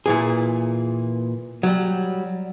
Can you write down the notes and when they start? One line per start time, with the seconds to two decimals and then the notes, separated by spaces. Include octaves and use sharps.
0.06 A#2 E3 G#4
1.63 F#3 G3